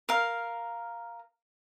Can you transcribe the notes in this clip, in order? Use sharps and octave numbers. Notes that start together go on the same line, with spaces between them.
A#4 F5